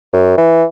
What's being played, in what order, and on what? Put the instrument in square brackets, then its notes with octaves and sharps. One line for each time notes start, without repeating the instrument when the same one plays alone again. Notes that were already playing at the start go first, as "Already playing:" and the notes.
[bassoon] F#2
E3